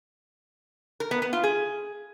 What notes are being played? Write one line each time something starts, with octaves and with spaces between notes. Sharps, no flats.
A#4
B3
B3
F4
G#4